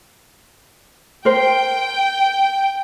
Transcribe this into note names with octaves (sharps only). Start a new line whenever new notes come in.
A#4 C5 G5